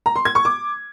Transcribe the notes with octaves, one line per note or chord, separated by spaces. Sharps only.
A#5
C6
G#6
C#6
D6